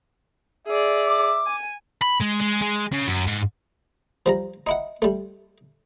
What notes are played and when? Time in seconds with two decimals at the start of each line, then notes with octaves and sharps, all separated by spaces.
0.67 G#4 D5 E5
1.06 D6
1.47 G#5
2.02 B5
2.21 G#3
2.41 G#3
2.62 G#3
2.93 C#3
3.08 F#2
3.27 G#2
4.26 F3 G3 A#5
4.67 D#4 E4 F#5
5.02 G3 A3